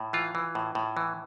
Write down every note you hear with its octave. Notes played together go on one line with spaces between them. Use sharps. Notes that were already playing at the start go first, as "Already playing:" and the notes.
Already playing: A2
E3 F4
E3
A2
A2
E3